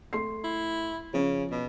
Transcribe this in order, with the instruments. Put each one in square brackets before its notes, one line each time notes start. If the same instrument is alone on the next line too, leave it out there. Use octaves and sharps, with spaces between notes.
[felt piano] A3 C6 C7
[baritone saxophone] E4
[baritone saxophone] C#3 [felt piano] F3 C#4
[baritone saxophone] B2